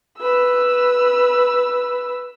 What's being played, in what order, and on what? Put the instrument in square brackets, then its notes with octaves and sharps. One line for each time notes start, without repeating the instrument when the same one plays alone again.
[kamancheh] B4 E6